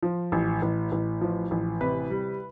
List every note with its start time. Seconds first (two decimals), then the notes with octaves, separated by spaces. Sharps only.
0.03 F3
0.32 A1
0.62 A1
0.92 A1
1.21 F3
1.51 A1
1.81 C3 B4
2.10 G3